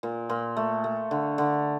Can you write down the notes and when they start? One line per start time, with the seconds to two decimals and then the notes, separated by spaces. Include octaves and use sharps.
0.03 A#2
0.29 A#2
0.57 A3
0.84 A3
1.11 D3
1.38 D3